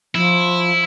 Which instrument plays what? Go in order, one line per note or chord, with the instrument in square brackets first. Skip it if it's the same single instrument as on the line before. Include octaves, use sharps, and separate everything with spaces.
[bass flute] F3 [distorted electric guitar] E4